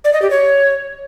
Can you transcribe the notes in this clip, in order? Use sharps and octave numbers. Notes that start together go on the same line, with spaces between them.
D5
D#5
G4
C#5